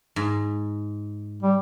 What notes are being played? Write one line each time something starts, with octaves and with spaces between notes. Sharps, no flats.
G#2
G3